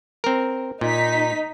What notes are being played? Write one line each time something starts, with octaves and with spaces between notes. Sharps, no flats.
C4 A#4
A#2 D#4 B6